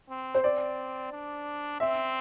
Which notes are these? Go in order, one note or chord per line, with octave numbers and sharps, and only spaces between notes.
C4
C5
C4 D5
D4
C4 E5